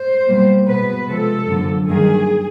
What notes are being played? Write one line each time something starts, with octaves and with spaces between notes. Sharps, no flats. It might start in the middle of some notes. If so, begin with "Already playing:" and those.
Already playing: C5
B2 G3 A#3
B2 G#3 B3 B4
C3 F3 G#3 A4
F#2 D3 F3 A#3
G2 D#3 F#3 A#3 G#4